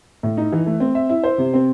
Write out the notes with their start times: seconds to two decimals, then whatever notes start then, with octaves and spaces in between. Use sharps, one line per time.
0.23 A2
0.37 D#4
0.52 E3
0.66 A3
0.80 C4
0.95 E5
1.09 E4
1.24 C5
1.38 C3
1.54 C4